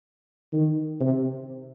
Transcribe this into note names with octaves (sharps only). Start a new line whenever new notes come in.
D#3
C3